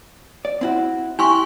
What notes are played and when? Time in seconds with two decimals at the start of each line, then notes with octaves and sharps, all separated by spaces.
0.45 D5
0.61 C4 E4 F#4
1.19 E4 G4 G#5 C6 C#6